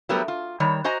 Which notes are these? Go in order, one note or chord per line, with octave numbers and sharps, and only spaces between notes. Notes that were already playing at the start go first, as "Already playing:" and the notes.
F#3 G3 A3 B3 G4 A#4
F4
D#3 G3 C#5
F#4 C5 D#5 G#5 A#5